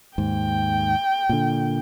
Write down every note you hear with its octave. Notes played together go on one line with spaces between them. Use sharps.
D#2 G#2 G5
A#2 D3